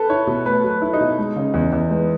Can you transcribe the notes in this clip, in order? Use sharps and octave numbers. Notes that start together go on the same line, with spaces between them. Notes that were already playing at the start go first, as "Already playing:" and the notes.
Already playing: A4 B4
E4 C#5
B2
A3 B4
F#3
B4
E4
D#4
B2
G#3
C#3
E2
E2
G#3 B3